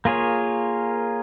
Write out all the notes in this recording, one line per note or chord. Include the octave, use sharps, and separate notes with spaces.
A#3 F4 G#4 C#5